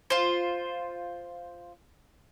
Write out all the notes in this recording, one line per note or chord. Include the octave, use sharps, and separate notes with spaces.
F4 C5